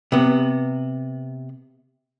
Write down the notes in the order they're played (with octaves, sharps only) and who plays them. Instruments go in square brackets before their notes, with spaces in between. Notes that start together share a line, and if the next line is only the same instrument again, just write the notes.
[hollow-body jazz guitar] C3 B3